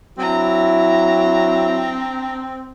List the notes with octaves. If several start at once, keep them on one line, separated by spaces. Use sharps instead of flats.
F#3 C4 D4 E4 A#5